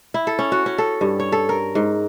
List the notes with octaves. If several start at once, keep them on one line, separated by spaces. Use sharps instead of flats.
E4
A4
C#4
F#4
C#4
A4
G2
C#5
A4
A#4
G#2